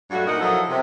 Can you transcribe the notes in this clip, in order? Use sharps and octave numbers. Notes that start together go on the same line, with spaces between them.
G2 F#3 G3 A3 F#4
A#2 D#4 A#4 D#5 F#5
F3 F#3 E4 A4 A#4 D#5
C3